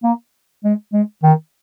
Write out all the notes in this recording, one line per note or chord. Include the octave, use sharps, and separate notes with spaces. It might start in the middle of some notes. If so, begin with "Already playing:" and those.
A#3
G#3
G#3
D#3